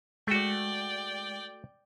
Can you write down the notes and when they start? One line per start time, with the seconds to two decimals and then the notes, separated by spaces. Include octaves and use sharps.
0.27 G#3 A3 F#4 D5 G5